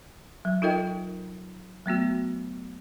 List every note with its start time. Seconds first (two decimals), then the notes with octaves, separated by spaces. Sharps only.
0.45 F#3
0.62 D#4 F4 A4 A#4 D#5 G5
1.86 F#3 A3 B3 F#4